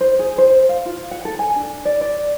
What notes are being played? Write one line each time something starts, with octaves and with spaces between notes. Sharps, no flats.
C5
G#4
C5
F5
F4
F#5
A4
G#5
D4
D5
D5